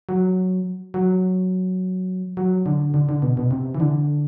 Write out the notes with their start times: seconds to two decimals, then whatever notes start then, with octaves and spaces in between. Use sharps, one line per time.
0.09 F#3
0.94 F#3
2.37 F#3
2.66 D3
2.94 D3
3.09 D3
3.22 B2
3.37 B2
3.51 C3
3.75 E3
3.80 D3